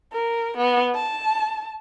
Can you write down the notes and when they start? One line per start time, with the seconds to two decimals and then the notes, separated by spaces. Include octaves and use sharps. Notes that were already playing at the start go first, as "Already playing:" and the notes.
0.13 A#4
0.57 B3
0.95 A5